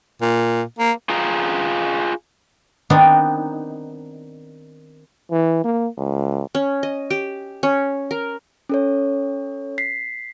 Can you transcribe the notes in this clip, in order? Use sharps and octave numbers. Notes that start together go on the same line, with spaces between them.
A#2
A#3
F4 G#4 F5 G5 A#5
D#3 B3 C4 D4 D#4
E3
A#3
C#2
C#4
D#5
G4
C#4
A#4
C#4 A4 C#5
B6 C7